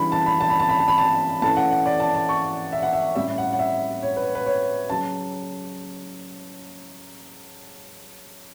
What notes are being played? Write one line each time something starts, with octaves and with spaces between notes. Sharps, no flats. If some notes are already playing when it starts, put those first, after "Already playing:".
Already playing: C#3 E3 G3 D4 B5
A5
B5
A5
B5
A5
B5
A5
B5
A5
E3 A3 C#4 A5
F#5
F#5
D5
A5
A5
C#6
E5
F#5
E5
A2 G3 C#4 E5
F#5
F#5
E5
C#5
B4
B4
C#5
C#3 F#3 A5